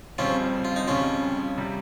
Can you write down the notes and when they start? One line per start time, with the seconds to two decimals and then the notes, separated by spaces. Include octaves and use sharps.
0.18 F2 C#3 G3 C4 C#4 F4
0.65 F4
0.76 D#4
0.88 F2 C#3 G3 C#4 F4
1.57 C3 G3